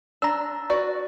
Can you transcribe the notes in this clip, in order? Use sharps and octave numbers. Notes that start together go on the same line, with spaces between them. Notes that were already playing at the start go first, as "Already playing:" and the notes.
D4 A#5 E6
F#4 B4 D5